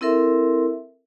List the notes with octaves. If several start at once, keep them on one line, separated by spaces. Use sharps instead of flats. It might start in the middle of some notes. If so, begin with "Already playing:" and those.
C4 E4 A4 A#4 E5 C6